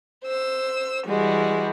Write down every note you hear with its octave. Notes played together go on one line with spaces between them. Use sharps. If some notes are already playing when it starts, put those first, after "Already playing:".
C5 E6
E3 G3 G#3 F#4